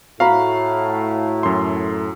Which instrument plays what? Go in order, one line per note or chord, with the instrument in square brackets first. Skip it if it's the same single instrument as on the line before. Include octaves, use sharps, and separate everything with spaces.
[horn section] A2 [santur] F#4 A#5 B5 [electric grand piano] F5
[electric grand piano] F#2 C6